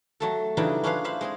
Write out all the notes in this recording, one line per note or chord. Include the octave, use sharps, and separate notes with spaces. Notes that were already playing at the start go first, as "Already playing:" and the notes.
F#3 A3 A4
C#3 E3 F#3 G3 D4 D#4
C#4 D4 F4 G#4 B4 F5
C5 E5 F5 B5
G#3 C4 G#4